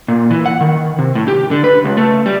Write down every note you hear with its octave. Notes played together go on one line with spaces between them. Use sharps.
A#2
E3
F#5
D#3
C3
A2
G4
D3
B4
C#2
A3
G3